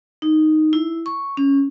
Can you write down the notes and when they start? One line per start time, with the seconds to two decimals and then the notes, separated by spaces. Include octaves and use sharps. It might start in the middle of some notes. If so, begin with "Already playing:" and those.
0.22 D#4
0.73 E4
1.06 C#6
1.37 C#4